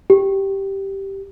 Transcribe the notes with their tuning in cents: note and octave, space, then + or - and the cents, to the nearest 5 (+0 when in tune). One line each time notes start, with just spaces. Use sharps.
G4 -5